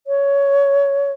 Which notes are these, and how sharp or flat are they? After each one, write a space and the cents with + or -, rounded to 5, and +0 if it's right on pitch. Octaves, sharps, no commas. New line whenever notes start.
C#5 +15